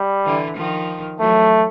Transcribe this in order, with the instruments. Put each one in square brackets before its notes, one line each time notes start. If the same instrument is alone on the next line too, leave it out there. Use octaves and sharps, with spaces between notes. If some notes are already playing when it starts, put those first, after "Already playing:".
Already playing: [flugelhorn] G3
[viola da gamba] D3 E3
D#3 F3
[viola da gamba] E3 F#3 [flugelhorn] A3